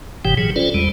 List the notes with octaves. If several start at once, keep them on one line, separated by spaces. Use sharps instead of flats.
F#1 G#2 C3 E3 G4 G5
A#2 E3 F#3 G#4
C#4 F4 A4 C5 D5
E2 G3 G#3